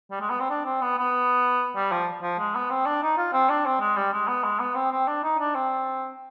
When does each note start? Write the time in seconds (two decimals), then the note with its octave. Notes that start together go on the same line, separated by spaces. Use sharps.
0.11 G3
0.21 G#3
0.30 B3
0.40 C4
0.50 D4
0.66 C4
0.81 B3
0.98 B3
1.76 G3
1.92 F3
2.23 F3
2.39 G#3
2.55 B3
2.70 C4
2.86 D4
3.03 D#4
3.18 F4
3.33 C4
3.50 D4
3.66 C4
3.80 G#3
3.97 G3
4.13 G#3
4.28 B3
4.44 G#3
4.60 B3
4.75 C4
4.92 C4
5.08 D4
5.23 D#4
5.39 D4
5.55 C4